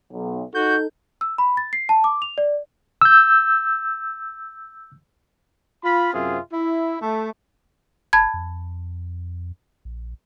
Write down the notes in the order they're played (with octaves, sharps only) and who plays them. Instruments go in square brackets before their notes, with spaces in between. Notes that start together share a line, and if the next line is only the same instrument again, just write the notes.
[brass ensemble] B1
[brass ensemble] D#4 A4 [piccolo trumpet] F#4 [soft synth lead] G6
[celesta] E6
B5
A6
C7
A5
D6
F7
D5
[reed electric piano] E6 G6
[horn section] F4 B5
F#2 C3 C4 F4 G#4 E5
E4
A3
[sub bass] F#1 [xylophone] A5 B5 G#6
[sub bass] F2
A#1